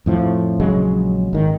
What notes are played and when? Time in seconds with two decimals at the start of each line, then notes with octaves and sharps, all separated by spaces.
0.06 F2 A2 F3
0.60 A#1 C#3 F#3 G#3
1.33 G#1 D#3